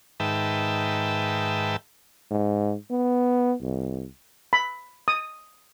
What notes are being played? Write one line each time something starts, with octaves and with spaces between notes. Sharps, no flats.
G#2 D#3 B4 E5 G5 A5
G#2
B3
C2
B5
D#6